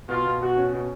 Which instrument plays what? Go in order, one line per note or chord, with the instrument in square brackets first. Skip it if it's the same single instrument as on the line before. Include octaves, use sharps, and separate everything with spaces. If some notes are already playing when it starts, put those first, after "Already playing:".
[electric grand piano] B2 [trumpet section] F4
[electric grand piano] B2
[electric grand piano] B2 [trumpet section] F#4
[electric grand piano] C#4
B2